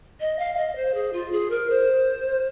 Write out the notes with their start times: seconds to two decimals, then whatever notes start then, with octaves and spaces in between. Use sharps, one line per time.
0.20 D#5
0.39 F5
0.57 D#5
0.76 C5
0.94 G#4
1.13 F4
1.32 G#4
1.50 A#4
1.69 C5